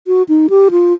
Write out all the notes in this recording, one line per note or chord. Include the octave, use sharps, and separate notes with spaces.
F#4
D#4
G4
F4